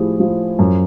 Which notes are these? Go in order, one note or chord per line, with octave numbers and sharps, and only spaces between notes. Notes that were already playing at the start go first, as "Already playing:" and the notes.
Already playing: A2 F3 E4 G4 G#4
F3
F#2